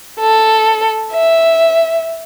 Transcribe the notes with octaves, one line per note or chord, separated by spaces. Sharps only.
A4
E5